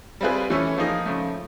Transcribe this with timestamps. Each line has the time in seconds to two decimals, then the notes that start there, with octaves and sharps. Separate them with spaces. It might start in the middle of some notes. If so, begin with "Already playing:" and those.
0.21 G3 C4 F4 G#4 B4
0.50 E3 A3 C#4 E4 A4
0.78 F3 A#3 D#4 G#4
1.05 C#3 F3 A3